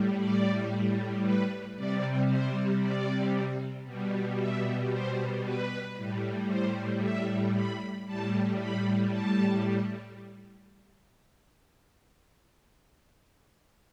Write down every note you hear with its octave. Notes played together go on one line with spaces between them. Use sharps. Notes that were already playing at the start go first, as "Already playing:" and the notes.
Already playing: A2 G3
D5
B4
C3 G3 D5
C5
D5
B2 G3
E5
C5
B4
A2 G3
C5
E5
B5
A2 G3 A5
B5
A5